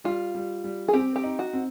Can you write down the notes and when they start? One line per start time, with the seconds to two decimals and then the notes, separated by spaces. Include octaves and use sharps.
0.04 G3 F4
0.35 G3
0.64 G3
0.88 G#4
0.93 C4 G4
1.16 G4
1.24 D#4
1.39 F#4
1.53 C4